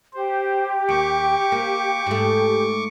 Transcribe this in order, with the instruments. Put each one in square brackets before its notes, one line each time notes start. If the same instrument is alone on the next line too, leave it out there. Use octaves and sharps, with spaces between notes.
[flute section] G4 [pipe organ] C5
[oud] D#2 [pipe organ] C#6 D6
[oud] A#3
G#2 A3